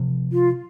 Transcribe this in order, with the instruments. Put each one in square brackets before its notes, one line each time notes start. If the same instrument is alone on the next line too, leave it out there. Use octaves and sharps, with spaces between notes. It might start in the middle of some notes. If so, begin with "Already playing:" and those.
Already playing: [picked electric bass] C3 F3
[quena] F4